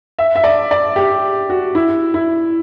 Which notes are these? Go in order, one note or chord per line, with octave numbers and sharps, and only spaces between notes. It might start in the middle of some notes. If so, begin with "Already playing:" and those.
E5
E5
D5
D5
G4
F#4
E4
E4